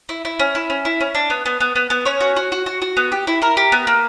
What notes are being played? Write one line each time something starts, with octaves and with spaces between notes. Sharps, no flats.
E4
E4
C#4
E4
C#4
E4
C#4
D4
B3
B3
B3
B3
B3
C#4 C#5
F#4
F#4
F#4
F#4
F#4
B3
G4
E4
E4 A#4
G4
B3
A#3